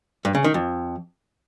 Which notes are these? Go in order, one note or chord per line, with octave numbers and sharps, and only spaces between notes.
G2
C#3
D#3
F2